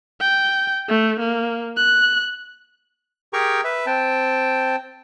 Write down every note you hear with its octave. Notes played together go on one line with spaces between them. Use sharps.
G5
A3
A#3
F#6
G4 G#4 A#4 G5 A#5 C#6
B4 E5
C4 G5 A5